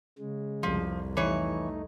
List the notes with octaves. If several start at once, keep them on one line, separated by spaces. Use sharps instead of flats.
C#3 G#3
C2 F2 F3
E3 A3 D#4 C#5